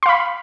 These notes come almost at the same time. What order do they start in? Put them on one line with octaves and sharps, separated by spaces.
C6 F5 B5